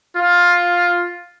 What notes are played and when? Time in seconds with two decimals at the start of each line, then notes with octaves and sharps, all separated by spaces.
0.16 F4